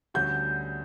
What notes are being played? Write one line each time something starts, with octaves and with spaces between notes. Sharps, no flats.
D2 D3 G3 C#4 F#4 G6